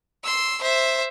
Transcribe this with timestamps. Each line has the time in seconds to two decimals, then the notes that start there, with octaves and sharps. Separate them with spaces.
0.24 C6 E6
0.62 C5 E5